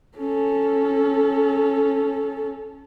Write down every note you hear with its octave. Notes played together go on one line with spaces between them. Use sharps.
C#4 A4